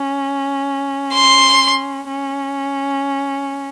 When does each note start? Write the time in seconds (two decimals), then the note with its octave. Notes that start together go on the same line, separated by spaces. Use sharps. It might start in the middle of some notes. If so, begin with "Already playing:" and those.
Already playing: C#4
1.14 C6
2.07 C#4